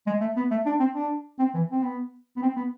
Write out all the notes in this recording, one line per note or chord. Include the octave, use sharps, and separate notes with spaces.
G#3
A3
B3
A3
D4
C4
D4
C4
E3
C4
B3
B3
C4
B3